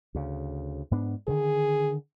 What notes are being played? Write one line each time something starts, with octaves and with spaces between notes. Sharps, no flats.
D2 C#3
G#2 B3 D4
D3 D#3 G#4